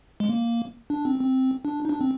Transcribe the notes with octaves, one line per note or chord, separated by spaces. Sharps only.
G#3
A#3
D4
C4
C4
D4
D#4
D4
C4